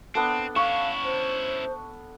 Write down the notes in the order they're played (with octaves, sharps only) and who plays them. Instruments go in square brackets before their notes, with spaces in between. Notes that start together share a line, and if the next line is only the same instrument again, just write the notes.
[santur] B3 D4 A4 [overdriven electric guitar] C4
[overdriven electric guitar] C#4 E4 [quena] F5 [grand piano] C#6
[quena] C5